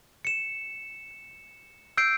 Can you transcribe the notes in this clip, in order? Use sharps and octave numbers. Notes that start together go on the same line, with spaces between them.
C#7 E7
E6 G6 C7 D7